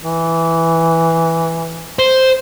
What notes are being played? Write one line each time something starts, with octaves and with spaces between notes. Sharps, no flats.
E3
C5